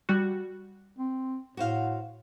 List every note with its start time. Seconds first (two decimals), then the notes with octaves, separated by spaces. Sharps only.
0.09 G3 F#4
0.99 C4
1.57 A2 F#4 C5 F5